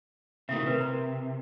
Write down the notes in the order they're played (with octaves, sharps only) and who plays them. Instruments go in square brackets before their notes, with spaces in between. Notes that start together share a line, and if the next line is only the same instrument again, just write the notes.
[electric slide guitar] C3 D#3 A3 [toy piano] E4 A4 E5
[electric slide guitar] C3 [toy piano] A#4 B4
[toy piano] A#5